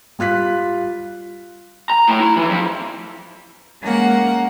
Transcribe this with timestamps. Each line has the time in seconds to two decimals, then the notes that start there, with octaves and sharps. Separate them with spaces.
0.19 G3 F4 F#6 B6
1.90 A#5
2.08 A2
2.20 E4
2.36 E3
2.49 F2
3.81 G#3 A#3 C#4 A#4 F#5